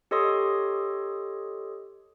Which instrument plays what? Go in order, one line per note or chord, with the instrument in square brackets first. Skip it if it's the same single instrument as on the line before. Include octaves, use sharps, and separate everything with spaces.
[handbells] G4 A4 C#5 D#5 C6 D#6